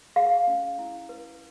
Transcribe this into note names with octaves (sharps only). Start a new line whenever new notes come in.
G#4 F5
C#4
E4
B4